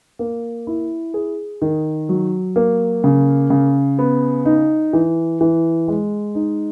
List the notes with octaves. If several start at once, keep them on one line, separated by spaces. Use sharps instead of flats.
A#3
E4
G#4
D#3
F#3
A#3
C#3
C#3
B3
D#4
E3
E3
G#3
D#4